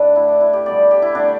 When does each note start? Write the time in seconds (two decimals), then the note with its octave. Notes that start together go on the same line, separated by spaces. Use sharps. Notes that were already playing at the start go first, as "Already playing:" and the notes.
Already playing: A2 D4 A4 B4
0.16 D3 A3 E4
0.28 D4
0.41 E4
0.53 G4
0.66 B2 G3 B3 D5
0.91 G4
1.02 E4
1.15 D3 A3 D4